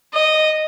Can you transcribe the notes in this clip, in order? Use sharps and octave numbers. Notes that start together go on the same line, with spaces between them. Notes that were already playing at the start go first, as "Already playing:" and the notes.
D#5